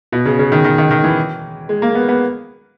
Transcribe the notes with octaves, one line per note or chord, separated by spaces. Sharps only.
B2
C#3
C#3
D#3
D#3
D#3
D#3
E3
G#3
A#3
B3
B3